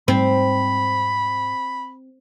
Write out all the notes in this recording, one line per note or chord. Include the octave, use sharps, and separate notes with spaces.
G#2 G3 C4 B5